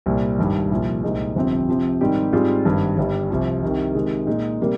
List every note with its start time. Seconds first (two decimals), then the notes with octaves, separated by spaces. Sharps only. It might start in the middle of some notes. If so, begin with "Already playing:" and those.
0.06 C2 A#2 G3
0.38 G#1 G2 G3
0.71 C2 A#2 F3
1.04 C2 A#2 G#3 D#4
1.36 G1 F2 C3 F3 C4
1.68 C3 F3 C4
2.01 G#2 D#3 G3 C4 G4
2.33 G#2 G3 C4 F4 G#4
2.65 G#1 G2 D#3
2.97 G1 G2 G3
3.31 C2 C3 F3
3.62 C2 C3 D#3
3.95 C3 D#3 G#3
4.27 A#2 G#3 D#4
4.61 C3 G3 A#3